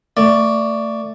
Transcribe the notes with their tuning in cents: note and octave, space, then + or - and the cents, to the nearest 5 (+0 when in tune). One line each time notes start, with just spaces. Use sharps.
A3 +25 D5 +0